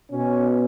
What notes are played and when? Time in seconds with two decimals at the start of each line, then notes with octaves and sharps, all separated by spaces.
0.10 B2 C#4